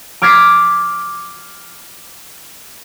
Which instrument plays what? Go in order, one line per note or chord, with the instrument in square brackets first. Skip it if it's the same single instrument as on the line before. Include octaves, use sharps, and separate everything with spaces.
[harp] D6 F6 G#6 A6 B6 C7